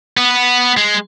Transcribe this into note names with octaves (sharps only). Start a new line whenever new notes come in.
B3
G#3